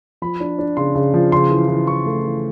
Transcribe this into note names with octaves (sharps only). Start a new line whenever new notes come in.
F3 B5
D4
D4
C#3 C6
C#3
F3
C#3 C6
E3
E3
E3 C#6
A3
E3